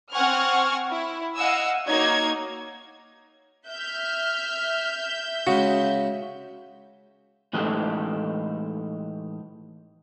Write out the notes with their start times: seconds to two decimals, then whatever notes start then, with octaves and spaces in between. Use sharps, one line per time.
0.12 C4 F#5 G#5 C#6 F6
0.89 E4
1.36 D#5 F5 F#5 G#5 E6
1.87 A#3 D#4 F#4 C#5 G#6
3.68 E5 F6 G6
5.47 C#3 G#3 F#4
7.53 A2 E3 G#3 D#4 G4 A4